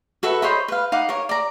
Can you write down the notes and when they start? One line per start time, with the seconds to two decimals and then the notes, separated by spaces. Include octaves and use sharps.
0.23 F#4 A4 B4 E5
0.42 C5 C#5 D#5 B5
0.68 B4 F5
0.92 D#4 F5 F#5 D6
1.09 A#4 C#5
1.29 D5 A#5